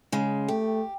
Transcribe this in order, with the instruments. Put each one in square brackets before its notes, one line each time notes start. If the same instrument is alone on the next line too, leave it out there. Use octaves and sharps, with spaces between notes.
[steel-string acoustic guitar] C#3 G#3
[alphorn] A3 [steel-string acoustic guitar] G4